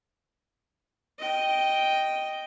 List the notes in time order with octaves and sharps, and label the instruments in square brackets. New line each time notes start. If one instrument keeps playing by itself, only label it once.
[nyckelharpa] D#5 G5